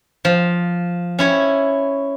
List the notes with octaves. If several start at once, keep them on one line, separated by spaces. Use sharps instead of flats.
F3
C#4 E4 C#5